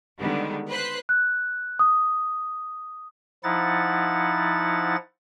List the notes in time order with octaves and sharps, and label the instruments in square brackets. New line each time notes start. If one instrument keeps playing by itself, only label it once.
[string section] D3 D#3 G3 G#3 B3
B4 C5 C6 F#6 B6 C7
[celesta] F#6
D#6
[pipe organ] F3 D#4 E4 F#5 A6